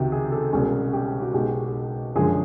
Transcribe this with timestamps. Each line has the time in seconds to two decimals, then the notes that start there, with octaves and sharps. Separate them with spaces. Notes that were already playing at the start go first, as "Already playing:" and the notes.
Already playing: C#2 C3 D#3 F#4 G4
0.12 G#4
0.32 A4
0.53 C2 B2 G#3 C#4
0.93 G4
1.22 F#4
1.33 B1 B2 G#3 G4
2.15 F#2 D3 F3 G#3 G#4